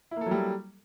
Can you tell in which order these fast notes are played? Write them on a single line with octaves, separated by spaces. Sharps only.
E4 A#3 A4 F#3 G3